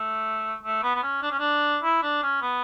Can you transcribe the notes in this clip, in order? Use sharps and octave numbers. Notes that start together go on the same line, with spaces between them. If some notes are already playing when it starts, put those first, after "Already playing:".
Already playing: A3
A3
B3
B3
C#4
D4
C#4
D4
E4
D4
C#4
B3